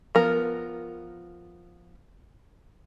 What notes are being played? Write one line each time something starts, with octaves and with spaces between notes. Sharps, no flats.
F3 B3 A#4